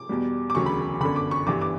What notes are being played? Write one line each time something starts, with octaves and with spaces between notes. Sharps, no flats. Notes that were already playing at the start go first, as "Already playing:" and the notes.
Already playing: D6
E2 B2 G3
D6
E1 D2 C#3 F#3 C#6
B5
G1 F#2 D3 B5
D6
C#6
G1 G2 E3 D6
D6